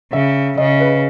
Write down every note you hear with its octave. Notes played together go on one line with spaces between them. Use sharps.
C#3 E5
C#3 D#5
B4